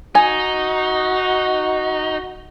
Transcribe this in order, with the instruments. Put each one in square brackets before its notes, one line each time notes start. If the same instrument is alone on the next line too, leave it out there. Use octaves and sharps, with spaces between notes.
[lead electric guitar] D#4 [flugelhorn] F#4 [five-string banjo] G#5